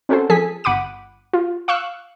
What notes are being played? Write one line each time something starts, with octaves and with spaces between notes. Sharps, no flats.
C4 C#4 F#4 A4 C5
F3 G#4 A4 G#5 B6
G1 F#5 B5 D6 D#7
F4
F5 C#6 E6 F#6